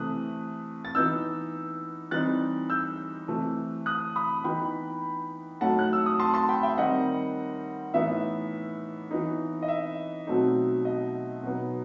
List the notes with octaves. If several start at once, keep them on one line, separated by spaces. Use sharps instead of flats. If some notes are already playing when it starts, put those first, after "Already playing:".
Already playing: C3 E3 A3 D#6 F#6
A6
E3 B3 D#4 E6 G6
E3 G3 C4 D#4 F#6 A6
E6 G6
C3 E3 A3
D#6 F#6
B5 D#6
E3 B3 D#4 G5 B5
A2 F#3 A3 D#4 F#5 A5
F#6
E6
D#6
A5 C6
A5 C6
G5 B5
E5 G5
D#3 G3 C4 D#4 D#5 F#5
A2 E3 B3 D#4 E5
E3 B3 D#4
D#5
E5
B2 F#3 A3 C4 D#4
D#5
B2 F#3 B3 D#4